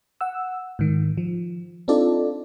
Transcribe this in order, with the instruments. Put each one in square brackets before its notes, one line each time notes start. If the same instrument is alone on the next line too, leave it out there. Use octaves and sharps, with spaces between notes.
[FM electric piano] F#5 E6
G#2 D#3
F3
C4 D4 D#4 F4 A4 D5